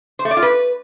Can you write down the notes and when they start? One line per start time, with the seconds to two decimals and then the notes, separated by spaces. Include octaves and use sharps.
0.19 C5
0.25 A3
0.31 D5
0.37 F4
0.43 B4